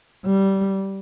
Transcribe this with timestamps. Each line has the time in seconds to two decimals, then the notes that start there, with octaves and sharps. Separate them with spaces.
0.26 G3